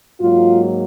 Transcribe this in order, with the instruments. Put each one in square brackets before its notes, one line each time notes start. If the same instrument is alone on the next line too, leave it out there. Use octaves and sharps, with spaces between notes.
[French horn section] G#2 F#3 A#3 F4